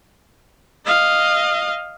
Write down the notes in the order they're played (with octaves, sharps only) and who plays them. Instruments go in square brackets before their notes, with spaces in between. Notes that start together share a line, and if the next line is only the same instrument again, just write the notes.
[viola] D#5 F5